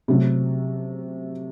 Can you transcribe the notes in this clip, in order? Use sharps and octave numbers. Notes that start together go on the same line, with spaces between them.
C3 F#3 A3